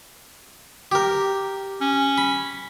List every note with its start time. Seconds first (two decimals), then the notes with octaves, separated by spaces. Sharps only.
0.92 G4 A#4
1.81 C#4
2.18 B5